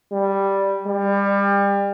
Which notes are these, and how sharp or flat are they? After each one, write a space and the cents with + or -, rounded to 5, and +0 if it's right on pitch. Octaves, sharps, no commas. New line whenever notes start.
G3 +0
G3 +30